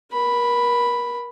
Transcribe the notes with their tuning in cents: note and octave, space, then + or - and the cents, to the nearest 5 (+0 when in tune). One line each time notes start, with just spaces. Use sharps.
A#4 +35 B5 +0